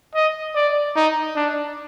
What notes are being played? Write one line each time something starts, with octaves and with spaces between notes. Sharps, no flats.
D#5
D5
D#4
D4